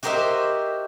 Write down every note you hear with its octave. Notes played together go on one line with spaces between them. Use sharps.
F#4 G4 A#4 C5 D#5 E5